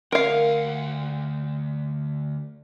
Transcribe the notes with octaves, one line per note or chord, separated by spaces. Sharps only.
D2 A#4 F5 F#5